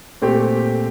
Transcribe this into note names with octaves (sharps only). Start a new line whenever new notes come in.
A#2 A3 C4 G4